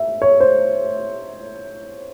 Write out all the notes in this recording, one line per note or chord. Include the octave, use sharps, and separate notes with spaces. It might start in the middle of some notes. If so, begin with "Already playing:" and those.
Already playing: E5
C#5
C5